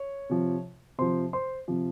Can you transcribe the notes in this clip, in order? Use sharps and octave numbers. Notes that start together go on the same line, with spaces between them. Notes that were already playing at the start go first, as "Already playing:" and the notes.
Already playing: C#5
C3 F3
C3 F3 C5 C6
C5 C6
C3 F3